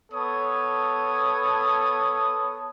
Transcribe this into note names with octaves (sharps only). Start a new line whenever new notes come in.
B3 A4 C#5 A5 D#6